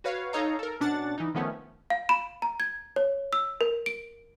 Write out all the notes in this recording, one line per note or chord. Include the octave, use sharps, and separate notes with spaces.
F#4 B4 C#5 F5
D#4 A4 C#5 D#5 F5 A#5
A4 A#4
B2 C#4 D4 F#5 A6
E3 D#4
D#3 F3 A3 B3 C#4
F5
B5
A#5
G#6
C#5
E6
A#4
D7